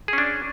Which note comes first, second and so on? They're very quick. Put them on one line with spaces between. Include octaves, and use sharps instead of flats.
G#4 C#4 D4